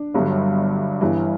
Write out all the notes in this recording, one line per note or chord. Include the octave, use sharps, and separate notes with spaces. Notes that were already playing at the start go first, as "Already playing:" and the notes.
Already playing: D4
G1 G2 D3 F#3
G1 G2 E3